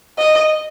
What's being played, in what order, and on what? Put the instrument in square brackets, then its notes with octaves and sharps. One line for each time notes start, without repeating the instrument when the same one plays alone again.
[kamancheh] D#5